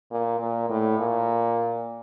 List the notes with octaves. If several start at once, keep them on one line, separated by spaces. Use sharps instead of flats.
A#2
A#2
A2
A#2